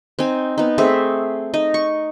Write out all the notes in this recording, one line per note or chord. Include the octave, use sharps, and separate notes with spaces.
C4 D#4 G#5
B3 D#4
A3 C4 G#4 E5
D#4 D#5
C#6